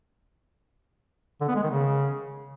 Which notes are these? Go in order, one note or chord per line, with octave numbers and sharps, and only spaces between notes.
D3
B3
G#3
D#3
C#3